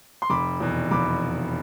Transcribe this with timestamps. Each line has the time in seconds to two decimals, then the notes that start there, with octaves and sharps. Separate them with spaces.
0.22 C6
0.30 F1 B5 D6
0.60 E2 B2
0.91 F1 B5 D6